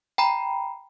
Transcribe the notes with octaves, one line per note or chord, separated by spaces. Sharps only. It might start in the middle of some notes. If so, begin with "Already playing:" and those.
G5 A#5 B5